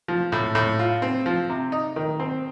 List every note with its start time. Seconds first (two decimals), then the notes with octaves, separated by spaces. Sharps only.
0.08 F3
0.32 A2
0.55 A2
0.79 F4
1.02 C4
1.26 F3
1.50 C3
1.72 D#4
1.96 D#3
2.20 C4